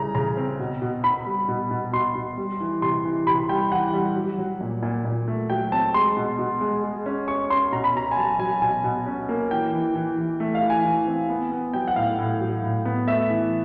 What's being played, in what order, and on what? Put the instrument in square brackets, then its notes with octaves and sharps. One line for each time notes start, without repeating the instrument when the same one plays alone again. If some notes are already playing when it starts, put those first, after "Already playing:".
Already playing: [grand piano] C#3 E3 G3 A#5
C#3 A#5
C4
B2
B2
B2 B5
G3
B2
B2
B2 C6
B2
G3
E3
C3 C6
E3
C3 B5
G3 G5
E3 F#5
G3
F#3
F#3
A#2
A#2
A#2
A3
F#3 G5
C4 A5
G#3 C6
B2
B2
G#3
G#3
C#4
C#4 C#6
C#4 C6
B2 A#5
B5
B2 A#5
G#5
F#3 A5
F#3 G#5
B2 G#5
B2
C#4
A#3
E3 G5
E3
E3
E3
A3
F5
E3
G#5
E3
C4
B3
B3
F#3 G5
F#5
A2 F5
A2
F#3
A2
B3
A3 E5
E3